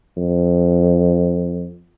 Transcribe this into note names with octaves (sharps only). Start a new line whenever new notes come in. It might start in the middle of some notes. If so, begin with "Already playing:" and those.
F2